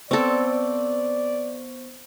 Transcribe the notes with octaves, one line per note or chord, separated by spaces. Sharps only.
B3 C4 A4 C5 D5 C#6